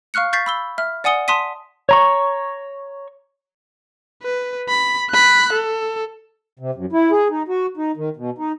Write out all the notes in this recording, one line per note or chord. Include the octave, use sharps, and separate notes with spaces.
F5 C#6 F6 F#6 C#7
C#6 G6 A6 B6 C7
B5 E6 G7
E5 F6
D5 F#5 G#5 D#6 C#7 G7
A5 C6 D#6 B6 D#7
C#5 A#5 C#6
B4
B5
B5 F#6
A4
C3
F#2
E4
G#4
D#4
F#4
D#4
D#3
B2
D#4